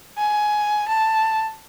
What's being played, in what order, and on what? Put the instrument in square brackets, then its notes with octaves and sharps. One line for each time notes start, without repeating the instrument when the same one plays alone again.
[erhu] G#5
A5